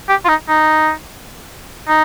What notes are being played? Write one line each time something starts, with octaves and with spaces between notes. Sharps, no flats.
G4
F4
D#4
D#4
D#4